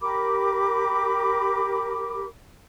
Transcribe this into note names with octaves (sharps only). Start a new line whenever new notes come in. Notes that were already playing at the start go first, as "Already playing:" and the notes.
G4 A#4 B5 D6